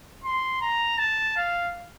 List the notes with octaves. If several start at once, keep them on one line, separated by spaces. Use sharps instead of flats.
C6
A#5
A5
F5